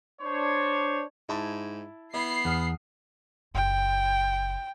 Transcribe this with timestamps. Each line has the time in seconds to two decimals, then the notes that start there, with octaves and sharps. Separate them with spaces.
0.22 D4 C5 C#5
1.29 G#2 E4 A5
2.14 B3 E4 C7
2.45 E2 F#5 D#6 F6
3.54 F#1 G5